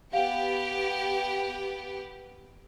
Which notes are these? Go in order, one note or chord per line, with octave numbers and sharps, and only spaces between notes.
B3 G4 F5 F#5